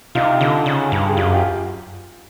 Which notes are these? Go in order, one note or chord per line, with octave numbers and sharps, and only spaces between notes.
C3 D#4 F4
D3
C#3
G2
G#4
F#2 F4 G4
F4 G4